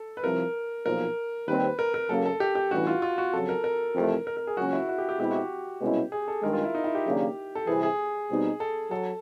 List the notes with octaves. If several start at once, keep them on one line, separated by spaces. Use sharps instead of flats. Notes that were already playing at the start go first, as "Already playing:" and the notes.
Already playing: A4
B4
C2 C3 F3 A#4
B1 A#2 F3 A#4
D#2 D#3 G3 C4 B4
A#4
A#4
F#2 C#3 F#3 A#3 A4
A4
G4
G4
A1 G2 E3 F#4
F4
F4
F#4
F2 C#3 F#3 A4
A#4
A#4
F2 C3 E3 A3
A#4
A#4
G#4
C#2 C#3 F#3 A#3 C#4 F#4
E4
F#4
G4
G4
B2 G#3 C4 E4 G4
F#4
G4
C2 B2 G#3 C#4 E4
G#4
A4
G2 D#3 G#3 A#4
F4
E4
D#4
E4
G4
D#2 C#3 F#3 A#3 D4
A4
C2 C3 E3 G#4
G#4
B2 G3 C4 D#4
A4
F#3 A4